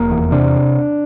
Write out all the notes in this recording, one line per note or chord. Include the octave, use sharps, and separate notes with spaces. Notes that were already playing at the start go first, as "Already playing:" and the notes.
Already playing: F1 A#3
E2
C3 D4